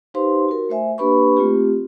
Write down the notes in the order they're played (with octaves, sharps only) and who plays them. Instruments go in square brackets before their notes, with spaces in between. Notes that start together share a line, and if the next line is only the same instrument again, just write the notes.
[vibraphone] D#4 G4 B4 C5 F5 C6
F#4 A#4
A3 C5 E5 G#5
A#3 D4 G4 B4 B5 C#6
A3 C4 F4 G4